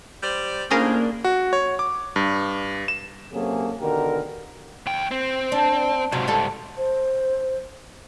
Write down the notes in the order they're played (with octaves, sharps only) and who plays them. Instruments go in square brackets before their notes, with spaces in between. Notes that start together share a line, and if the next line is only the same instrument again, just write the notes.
[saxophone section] G3 C5 D5
[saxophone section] A2 F4 C5 [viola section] A#3 D4 [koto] C#4 G#4 A#4
[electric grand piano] F#4
C#5
D6
G2
E7
[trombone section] C3 F#3 A#3 C#4 G#4 A4
B2 D3 D#3 G4 A#4
[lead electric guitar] D#2 G5
C4
[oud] D4
[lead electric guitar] C#2 G#2 [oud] C3 F#3
[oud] G3 A4
[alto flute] C5